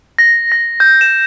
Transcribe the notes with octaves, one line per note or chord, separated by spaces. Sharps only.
A#6
A#6
G6
E7